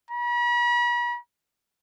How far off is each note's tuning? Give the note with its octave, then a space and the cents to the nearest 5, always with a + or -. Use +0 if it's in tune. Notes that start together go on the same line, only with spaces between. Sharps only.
B5 -45